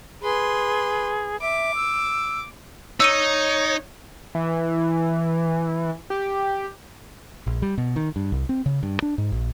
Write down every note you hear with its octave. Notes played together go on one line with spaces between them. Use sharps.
G#4 B4 C6
E5 D6
E6
D#4 C#5 E6 C#7 D#7
E3
G4
A#1
G3
B2
D#3
G2
C2
C4
C#3
G2
D4
G#2
A#1